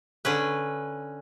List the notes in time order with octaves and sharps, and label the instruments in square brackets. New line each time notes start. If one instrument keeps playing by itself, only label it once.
[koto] D3 C#4 B4